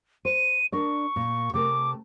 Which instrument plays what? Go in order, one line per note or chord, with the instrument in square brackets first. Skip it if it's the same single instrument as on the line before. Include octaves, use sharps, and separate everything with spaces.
[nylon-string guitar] C5 [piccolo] D#7
[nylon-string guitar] D4 A#4 D5 [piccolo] C#6
[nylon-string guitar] A#2
[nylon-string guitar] C3 A3 A#4 [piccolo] D6